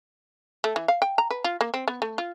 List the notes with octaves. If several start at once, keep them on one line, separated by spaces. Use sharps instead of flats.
A3
E3
F5
G5
A#5
B4
F4
A#3
C4
B3
A3
F4